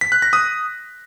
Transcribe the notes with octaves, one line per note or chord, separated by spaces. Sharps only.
B6
F#6
A#6
D#6